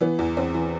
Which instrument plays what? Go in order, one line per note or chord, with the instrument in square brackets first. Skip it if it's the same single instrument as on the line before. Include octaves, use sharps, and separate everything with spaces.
[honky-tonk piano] E3 B3
E2
E2 C4
E3